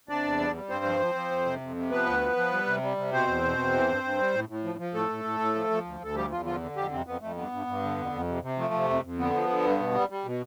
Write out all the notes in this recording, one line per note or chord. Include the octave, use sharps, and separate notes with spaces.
C3 D4 D5
E2
G3
G3
G2 C4 C5
F3
F3
F3
F2
C3
F2
C3
F3 B3 B4
D2
F3
F3
G3
C3
G3
C3
B2 C4 C5
E2
B2
E2
E3
G2
G2
G3
A2
A2
F3
F3
A2 A3 A4
A2
A2
A2
F3
F3
D2
D2 A4
F3 G3 G4
E2 F3 F4
D3 F3 F4
D3
F2 G3 G4
F2 C3 C4
F2 B3
F2 A3
G2 B3
G2
G2
D3
F2
F2
C3
C3
F3 A3
C3
F2
F2
D3 B3
F3
D3
G2
B2
G3
G3
B2